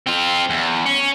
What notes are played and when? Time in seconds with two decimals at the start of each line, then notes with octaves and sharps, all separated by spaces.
0.07 C4 F4
0.50 E2
0.86 C#4